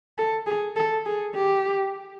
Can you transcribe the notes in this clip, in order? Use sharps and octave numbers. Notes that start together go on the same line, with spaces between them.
A4
G#4
A4
G#4
G4